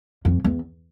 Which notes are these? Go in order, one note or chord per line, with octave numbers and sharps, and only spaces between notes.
F2
E2